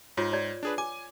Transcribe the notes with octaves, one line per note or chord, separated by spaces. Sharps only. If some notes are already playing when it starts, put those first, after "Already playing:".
G#2 F4 C#5
C#5 D5
D4 G#4 B4
G#5 D6